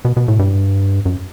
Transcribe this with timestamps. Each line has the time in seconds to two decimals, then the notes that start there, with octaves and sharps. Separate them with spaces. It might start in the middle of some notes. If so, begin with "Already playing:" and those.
0.05 B2
0.17 B2
0.28 A2
0.39 G2
1.05 F#2